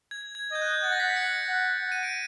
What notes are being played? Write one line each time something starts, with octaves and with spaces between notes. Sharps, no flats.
G#6
G#6
D#5 G6
F#6
G6
F#5 A6
A#6
B6
C#7
F#5
F#5
D#7
D7